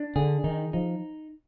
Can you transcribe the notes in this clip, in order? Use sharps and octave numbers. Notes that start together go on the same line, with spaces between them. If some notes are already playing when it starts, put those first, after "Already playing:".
Already playing: D4
D3 G#4
D#3 D#4
F3 D#4